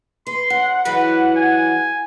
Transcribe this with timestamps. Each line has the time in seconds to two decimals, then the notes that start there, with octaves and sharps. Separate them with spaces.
0.27 B4 C6
0.50 F#2 F#5
0.85 E3 F#3 G#3 B4
1.36 G#5